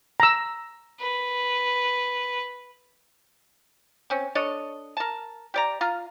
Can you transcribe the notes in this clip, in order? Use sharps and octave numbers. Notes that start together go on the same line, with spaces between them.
A#5 E6
B4
C4 C#4
D4 A4 C#5 D#5
A#4 A5
G4 D5 A#5
F4 F5 A#5